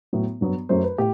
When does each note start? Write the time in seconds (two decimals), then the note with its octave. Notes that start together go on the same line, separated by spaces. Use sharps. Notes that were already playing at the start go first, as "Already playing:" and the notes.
0.13 A2 F#3 B3
0.41 G2 F#3 B3
0.69 F#2 F#3 A3 C5
0.84 B4
0.98 A2 G4